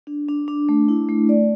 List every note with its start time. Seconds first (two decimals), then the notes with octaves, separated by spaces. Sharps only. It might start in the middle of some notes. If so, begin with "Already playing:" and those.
0.07 D4
0.28 D4
0.48 D4
0.69 A3
0.88 E4
1.09 A3
1.29 D5